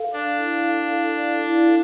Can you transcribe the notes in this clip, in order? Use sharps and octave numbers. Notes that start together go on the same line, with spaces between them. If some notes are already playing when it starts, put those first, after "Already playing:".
Already playing: A4 F5
D4 D5
E4
F5
A4
D5
E4
F5